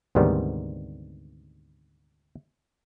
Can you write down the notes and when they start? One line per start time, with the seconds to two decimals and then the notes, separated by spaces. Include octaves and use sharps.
0.15 D2 G#2 C3 D#3 G3 B3